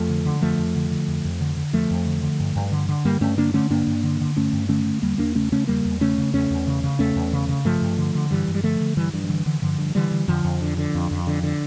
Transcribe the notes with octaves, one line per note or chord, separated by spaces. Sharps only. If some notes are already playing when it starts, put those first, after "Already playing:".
Already playing: F2 F3 A3
D3
D3
F2 F3 A3
F2
D3
D3
F2
F2
D3
D3
F2 F3 A3
F2
D3
D3
G2
G2
D3
D3
G2 G3 A#3
G2 A3 C#4
D3 A#3 D4
D3 A3 C#4
G2 A#3 D4
G2
D3
D3
G2 A3 C#4
G2
D3 A3 C#4
D3
E2 G3 A#3
E2 A#3 D4
C#3 A3 C#4
C#3 A3 C#4
E2 G3 A#3
E2
C#3 A3 C#4
C#3
E2 A3 C#4
E2
C#3
C#3
E2 A3 C#4
E2
C#3
C#3
G2 F3 A3
G2
D3
D3
G2 E3 G3
G2
G3
D3 F3 A3
D3
G2 E3 G3
G2 E3
F3
D3 E3
D3 E3
G2 D3 F3
G2
D3 E3 G3
D3
F2 D3 F3
F2
D3
D3
F2
F2
D3
D3